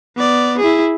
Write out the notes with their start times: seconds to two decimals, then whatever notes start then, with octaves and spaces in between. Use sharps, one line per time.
0.16 B3 D5
0.59 E4 G#4